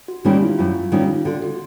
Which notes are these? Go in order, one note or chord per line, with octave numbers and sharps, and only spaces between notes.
F#4
D#3 G3 A#3 C#4 F4
E4
F#2 F4
D#3 G3 A#3 C#4 F4
D3 F#4
F#4